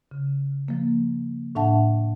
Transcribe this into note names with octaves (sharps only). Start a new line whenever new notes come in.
C#3
F3 A#3
A2 D4 E5 F#5 A5